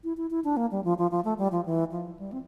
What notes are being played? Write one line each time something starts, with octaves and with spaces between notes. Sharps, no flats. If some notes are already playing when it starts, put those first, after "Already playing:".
E4
E4
E4
D4
A#3
G3
F3
F3
F3
A3
G3
F3
E3
F3
G3
C4